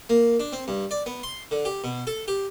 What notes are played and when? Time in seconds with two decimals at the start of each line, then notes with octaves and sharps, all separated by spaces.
0.10 A#3
0.40 D4
0.53 C4
0.68 G2
0.91 D5
1.06 B3
1.23 C6
1.51 D3
1.65 G4
1.84 B2
2.07 A4
2.28 G4